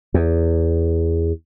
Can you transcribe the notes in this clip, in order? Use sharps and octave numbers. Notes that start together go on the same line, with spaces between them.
E2